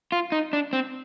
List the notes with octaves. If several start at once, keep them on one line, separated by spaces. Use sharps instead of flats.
F4
D#4
D4
C4